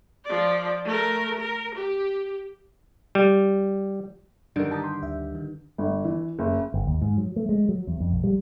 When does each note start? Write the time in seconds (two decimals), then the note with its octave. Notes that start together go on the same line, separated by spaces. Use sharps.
0.25 F3 D5
0.85 A3 A#4
1.40 A#4
1.75 G4
3.15 G3
4.56 G2 D3 D#3 F#3 A#4
4.71 G4 A5 A#5 D#6
4.84 C6
5.02 D2 E5
5.35 D#3
5.78 G1
6.04 E3
6.39 F#1
6.74 G1
6.87 D#2
7.02 G#2
7.17 F#3
7.36 A3
7.49 G#3
7.69 F#3
7.87 E2
8.00 F2
8.12 A#1
8.24 G3